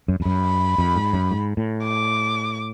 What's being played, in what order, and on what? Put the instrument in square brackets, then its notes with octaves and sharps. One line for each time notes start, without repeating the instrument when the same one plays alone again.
[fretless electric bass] F#2
F2
[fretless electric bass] F#2 [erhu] B5
[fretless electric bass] F2
G#2
F#2
G#2
A2
[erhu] D6